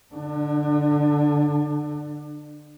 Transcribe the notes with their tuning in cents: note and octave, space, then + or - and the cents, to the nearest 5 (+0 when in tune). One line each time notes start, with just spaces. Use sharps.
D3 +0 D4 +35